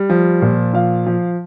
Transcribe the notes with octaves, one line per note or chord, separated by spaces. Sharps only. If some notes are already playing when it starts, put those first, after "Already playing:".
Already playing: G3
F3
A#2
F3 F5
F3